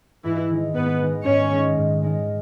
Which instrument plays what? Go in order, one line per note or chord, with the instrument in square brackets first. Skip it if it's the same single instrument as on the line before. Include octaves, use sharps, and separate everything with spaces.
[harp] G#2 [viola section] E3 E4
[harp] D#3 G#3 D#4
[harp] G#2 [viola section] B3 B4
[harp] D#3 G#3 D#4
[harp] G#2 [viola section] C#4 C#5
[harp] D#3 G#3 D#4
G#2
D#3 G#3 D#4